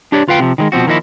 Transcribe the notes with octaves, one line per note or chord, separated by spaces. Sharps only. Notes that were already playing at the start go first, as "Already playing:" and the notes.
D4 G4 C#5 D5
D2 F4 B4 F5 G5
C3 F3
D#3 F3 G#3
B2 F3 C4 F#4
D#3 F3 A#3 C#4 D#4 E4